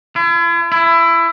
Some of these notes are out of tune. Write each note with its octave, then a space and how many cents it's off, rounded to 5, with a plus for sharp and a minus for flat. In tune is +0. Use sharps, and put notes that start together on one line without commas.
E4 +45
E4 +20